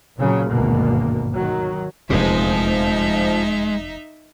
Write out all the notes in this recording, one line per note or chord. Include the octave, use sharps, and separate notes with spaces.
A#2 C#3 F#3
G#1 D2 G2 B2 A#3
D#3 F#3
F1 E2 A#2 F3 G#3 D#4 E5